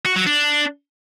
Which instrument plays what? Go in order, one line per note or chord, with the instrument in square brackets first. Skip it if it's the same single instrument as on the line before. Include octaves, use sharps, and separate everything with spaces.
[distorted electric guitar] F#4
F#3
D4